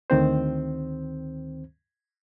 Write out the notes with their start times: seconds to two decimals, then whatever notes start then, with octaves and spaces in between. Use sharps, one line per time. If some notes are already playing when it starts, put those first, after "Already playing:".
0.10 D2 D#3 C4 C5